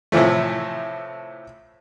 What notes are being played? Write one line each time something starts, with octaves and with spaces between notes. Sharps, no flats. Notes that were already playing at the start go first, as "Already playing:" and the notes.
A2 C3 E3 F3 A3